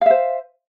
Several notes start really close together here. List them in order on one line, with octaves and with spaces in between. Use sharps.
F5 E5 C5